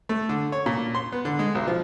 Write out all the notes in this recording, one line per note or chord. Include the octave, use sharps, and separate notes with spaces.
A3
D3
C#5
A#2
C6
B3
D3
G#3
B1
F3